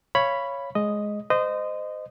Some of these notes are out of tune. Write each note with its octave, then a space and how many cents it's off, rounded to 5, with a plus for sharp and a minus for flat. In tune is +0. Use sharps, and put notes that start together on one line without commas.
C#5 +0 F5 -25 B5 +0
G#3 +10 D#5 +0
C5 -30 D#5 -15